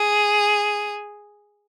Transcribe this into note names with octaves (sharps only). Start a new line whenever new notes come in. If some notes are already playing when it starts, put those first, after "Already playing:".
Already playing: G#4